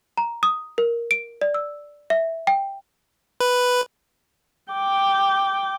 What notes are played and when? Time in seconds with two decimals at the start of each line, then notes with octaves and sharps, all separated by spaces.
0.18 A#5
0.43 D#6
0.78 A#4
1.11 D7
1.41 D5
1.54 E6
2.10 E5
2.47 G5
3.41 B4
4.73 G5 D6